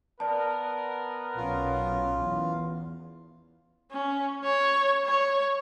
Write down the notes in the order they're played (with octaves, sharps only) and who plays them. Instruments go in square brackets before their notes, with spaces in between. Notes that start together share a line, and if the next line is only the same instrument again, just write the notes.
[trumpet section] B3 A#4 [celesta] D5 A5
[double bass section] B1 C#4 [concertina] F4
[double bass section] E2
[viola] C#4
C#5
C#5